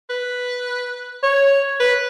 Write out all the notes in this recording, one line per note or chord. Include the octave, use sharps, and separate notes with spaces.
B4
C#5
B4